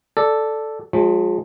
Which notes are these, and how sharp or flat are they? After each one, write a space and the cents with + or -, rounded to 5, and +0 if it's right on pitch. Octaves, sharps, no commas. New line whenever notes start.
A4 +0 D5 +0
F3 +40 G#3 +0